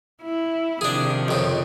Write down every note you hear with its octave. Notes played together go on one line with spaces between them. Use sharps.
E4
C3 D#3 F3 D4 G#4
F2 C#3